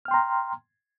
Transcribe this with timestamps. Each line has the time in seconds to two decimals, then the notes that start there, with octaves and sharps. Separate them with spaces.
0.05 F6
0.08 G5
0.11 C6
0.14 A#5